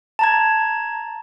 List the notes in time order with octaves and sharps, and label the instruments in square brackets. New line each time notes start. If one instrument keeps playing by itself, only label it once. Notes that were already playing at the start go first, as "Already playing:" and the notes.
[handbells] A5 A#5 G#6